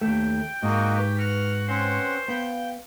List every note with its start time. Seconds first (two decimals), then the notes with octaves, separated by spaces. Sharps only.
0.01 D#2 A3 G5
0.63 G#2 A#3 F#4 D#5
0.95 G4 B4 C#6
1.18 F#4 F6
1.68 C4 C#4 C5 F#5
2.28 B3 F5 G5 G6